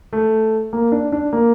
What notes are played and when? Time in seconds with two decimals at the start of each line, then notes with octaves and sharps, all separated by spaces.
0.13 A3
0.73 A#3
0.92 D4
1.12 D4
1.33 A#3